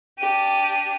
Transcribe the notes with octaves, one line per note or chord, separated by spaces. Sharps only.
D4 G4 D#7